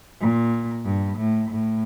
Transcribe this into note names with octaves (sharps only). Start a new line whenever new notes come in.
A#2
G2
A2
A2